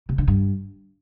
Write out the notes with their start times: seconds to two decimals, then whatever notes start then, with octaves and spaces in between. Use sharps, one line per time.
0.09 C3
0.18 D3
0.27 G2